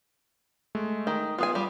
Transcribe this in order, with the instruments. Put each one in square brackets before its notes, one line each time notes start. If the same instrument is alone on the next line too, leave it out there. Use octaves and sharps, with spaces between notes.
[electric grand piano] G#3 A3
[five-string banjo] D#3
[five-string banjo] B3 G#4 G#5 [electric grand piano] F4
[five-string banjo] G3